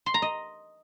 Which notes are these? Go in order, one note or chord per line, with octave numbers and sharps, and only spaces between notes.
C6
A#5
D#5